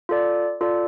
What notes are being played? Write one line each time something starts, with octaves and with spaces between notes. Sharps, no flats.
F4 A4 D5
F4 A4 D5